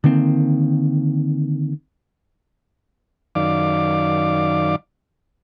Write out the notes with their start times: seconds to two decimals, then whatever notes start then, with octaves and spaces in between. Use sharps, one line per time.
0.04 D3 D#3 A#3 C4
3.35 F#2 D#3 D5 F5 D6